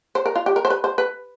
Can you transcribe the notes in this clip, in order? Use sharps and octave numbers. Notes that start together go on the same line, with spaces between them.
C5
A#4
F4
G4
A#4
C5
B4
C5
B4